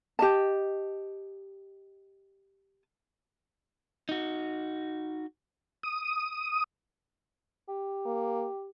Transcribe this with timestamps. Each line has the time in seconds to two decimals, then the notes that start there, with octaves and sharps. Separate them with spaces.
0.19 G4 D#5 A5
4.09 D#4 F#4
5.83 D#6
7.68 G4
8.06 A#3